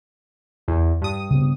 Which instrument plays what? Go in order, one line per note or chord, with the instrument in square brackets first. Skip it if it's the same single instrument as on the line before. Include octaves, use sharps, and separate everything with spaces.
[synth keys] E2
G2 D#6
[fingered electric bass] C#3 B3